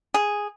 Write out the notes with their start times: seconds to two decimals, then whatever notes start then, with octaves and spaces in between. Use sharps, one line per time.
0.14 G#4